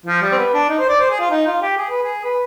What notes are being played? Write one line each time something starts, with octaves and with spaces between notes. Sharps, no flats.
F3
G3
C4
B3
D4
D#4
C5
D5
C5
G#4
F4
D#4
F4
G4
G#4
B4
G#4
B4